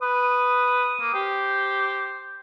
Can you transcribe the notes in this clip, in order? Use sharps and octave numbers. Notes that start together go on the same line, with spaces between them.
B4 D#6
A#3
G4 C5